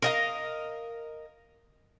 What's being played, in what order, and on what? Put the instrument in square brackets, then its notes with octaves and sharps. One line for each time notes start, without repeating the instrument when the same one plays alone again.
[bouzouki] A#4 D#5 F5